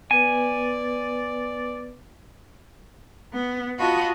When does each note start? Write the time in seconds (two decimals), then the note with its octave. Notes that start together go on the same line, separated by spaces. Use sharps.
0.11 B3 B4 D5 G#5
3.34 B3
3.78 F4 F#4 D#5 A5 B5